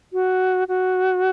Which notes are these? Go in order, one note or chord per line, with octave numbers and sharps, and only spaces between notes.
F#4
F#4